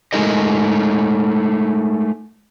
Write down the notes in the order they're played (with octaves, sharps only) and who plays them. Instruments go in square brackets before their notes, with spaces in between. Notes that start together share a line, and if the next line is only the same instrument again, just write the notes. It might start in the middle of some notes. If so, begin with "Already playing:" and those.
[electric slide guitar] G#3 A3 D#4 A#4 D#5